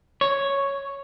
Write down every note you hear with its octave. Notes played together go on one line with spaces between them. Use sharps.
C#5